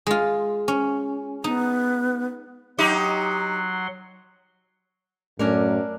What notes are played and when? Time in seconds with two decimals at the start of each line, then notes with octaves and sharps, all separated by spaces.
0.07 G#3 F4
0.68 C#4
1.44 B3 D#4
2.79 F#3 D#4 G4 F#5 C6
5.39 F#2 A2 A3 C#4 D4 A#4